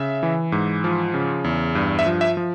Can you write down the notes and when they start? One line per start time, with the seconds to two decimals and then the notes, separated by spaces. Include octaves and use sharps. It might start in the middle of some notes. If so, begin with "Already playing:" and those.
Already playing: C#3 E5
0.23 E3
0.52 G#2
0.84 F3
1.14 C#3
1.44 E2
1.75 G2
1.99 E5
2.06 F3
2.21 E5
2.37 F3